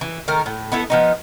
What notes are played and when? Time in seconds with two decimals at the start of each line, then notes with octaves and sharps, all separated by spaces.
0.01 E3
0.28 D#3 A3 A#4
0.46 A2
0.72 B3 E4 A4
0.90 F3 B3 D#4